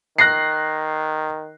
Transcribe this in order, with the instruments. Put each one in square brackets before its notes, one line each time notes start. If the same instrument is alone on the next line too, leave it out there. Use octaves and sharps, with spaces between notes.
[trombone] D#3 [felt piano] F#6 A#6 C7